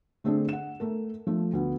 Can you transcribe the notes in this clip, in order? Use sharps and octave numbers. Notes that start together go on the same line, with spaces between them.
D3 A3 C4 D4 G#4
F#5 E7
A3 A4 A#4
F3 A3
D2 B3